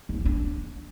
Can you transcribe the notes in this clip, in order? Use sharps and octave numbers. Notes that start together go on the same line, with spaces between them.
G#3
F3
C4
D4